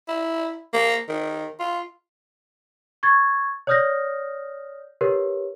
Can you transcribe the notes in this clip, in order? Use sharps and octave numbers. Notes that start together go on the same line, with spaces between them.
E4
A#3
D#3
F4
C#6 G#6 A6
C#5 D5 D#6 F6 G6 A#6
G4 A#4 B4 C#5